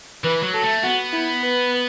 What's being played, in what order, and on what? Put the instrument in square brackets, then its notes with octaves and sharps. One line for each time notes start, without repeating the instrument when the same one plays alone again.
[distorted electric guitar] E3 [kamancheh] B4
[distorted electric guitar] F#3
[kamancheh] A4
[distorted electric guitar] A3
[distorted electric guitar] B3 [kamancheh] F#4
[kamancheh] E4
B4